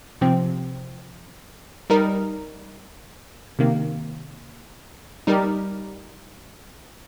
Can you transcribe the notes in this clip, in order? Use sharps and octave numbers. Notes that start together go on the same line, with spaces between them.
C3 F3 C4
G3 D#4 A#4
C3 D#3 A#3
G3 D#4 G4 A#4